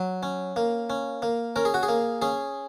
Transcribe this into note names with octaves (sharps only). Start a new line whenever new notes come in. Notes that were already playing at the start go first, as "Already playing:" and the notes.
Already playing: F#3
C#4
A#3
C#4
A#3
C#4 A#4
G#4
F#4
G#4
A#3
C#4 G#4